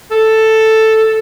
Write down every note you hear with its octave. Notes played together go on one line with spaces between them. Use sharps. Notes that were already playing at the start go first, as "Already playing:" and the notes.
A4